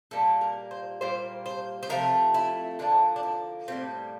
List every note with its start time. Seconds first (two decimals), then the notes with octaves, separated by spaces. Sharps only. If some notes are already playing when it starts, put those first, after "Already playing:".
0.11 A#2 G3 A#3 A4
0.41 A#4
0.71 C5
1.01 A#2 G3 A#3 C5
1.46 C5
1.83 C5
1.89 C3 F3 A3 A#4
2.34 E4
2.79 D3 F3 A#3 D4
3.16 D4
3.23 E4
3.68 A2 G3 A#3 C4